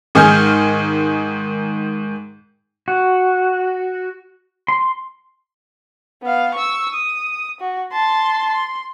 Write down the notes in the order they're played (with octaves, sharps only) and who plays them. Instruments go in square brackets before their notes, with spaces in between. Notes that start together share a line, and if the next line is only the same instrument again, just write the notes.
[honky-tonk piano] G#2 D#3 G#4 F6 G6
[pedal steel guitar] F#4
C6
[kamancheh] B3 F5
C#6 E6
D#6
F#4
A5 C6
C6